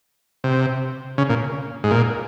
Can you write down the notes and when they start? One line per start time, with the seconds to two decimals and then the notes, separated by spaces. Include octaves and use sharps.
0.44 C3
1.18 C#3
1.30 A#2
1.84 G#2
1.91 A#2